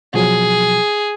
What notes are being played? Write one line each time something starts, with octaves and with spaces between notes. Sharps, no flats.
B2 F3 F#3 G#4